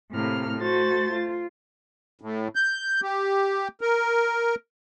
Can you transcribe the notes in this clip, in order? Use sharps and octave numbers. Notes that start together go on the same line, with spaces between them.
A2 C3 A#3 F6
A3 F#4 C5 A6
F4
A2
G6
G4
A#4